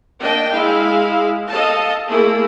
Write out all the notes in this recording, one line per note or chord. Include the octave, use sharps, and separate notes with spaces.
A#3 D4 D#5 G5
G#3 E4 F5
A4 D#5 F5 A5
A3 A#3 E4 G#4